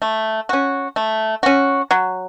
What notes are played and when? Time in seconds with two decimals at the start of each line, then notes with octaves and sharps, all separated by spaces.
0.02 A3
0.49 C#4 F#4
0.96 A3
1.43 C#4 F#4
1.91 F#3